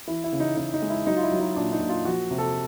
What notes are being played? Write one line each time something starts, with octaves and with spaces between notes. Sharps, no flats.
E3 E4
E4
C#3
D#4
C#3 D#4
D#4
G#3
E4
F#3 D#4
F4
E4
F#3
D#4
A#2 D4
D#4
A#2
F4
F3 F#4
C3
A4